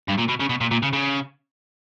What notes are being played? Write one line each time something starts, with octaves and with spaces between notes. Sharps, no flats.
G2
A#2
B2
C#3
B2
A#2
A#2
C#3
C#3